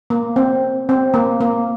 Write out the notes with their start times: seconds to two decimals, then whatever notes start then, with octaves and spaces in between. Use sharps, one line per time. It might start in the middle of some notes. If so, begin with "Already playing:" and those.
0.10 A#3
0.36 C4
0.89 C4
1.14 A#3
1.41 A#3